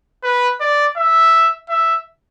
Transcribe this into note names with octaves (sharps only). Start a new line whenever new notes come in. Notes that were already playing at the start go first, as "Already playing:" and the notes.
B4
D5
E5
E5